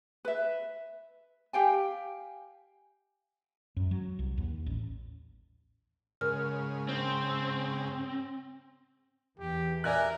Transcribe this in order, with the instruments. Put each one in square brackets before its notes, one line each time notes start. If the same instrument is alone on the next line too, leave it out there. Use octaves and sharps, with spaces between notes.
[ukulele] B4 E5
G4 F5 G5 G#5
[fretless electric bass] F#2
F#3
C2
D#2
A1
[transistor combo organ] G#2 C#3 [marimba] A#4 F6
[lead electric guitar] C4
[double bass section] E2 E3 [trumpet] G4
[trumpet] A#4 [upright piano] D5 G#5 F#6 [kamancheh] E5